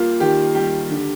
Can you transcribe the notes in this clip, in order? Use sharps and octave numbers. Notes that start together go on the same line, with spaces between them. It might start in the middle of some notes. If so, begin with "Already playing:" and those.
Already playing: G3 A#3 F4 G4
D#3 G4
G3 G4
D3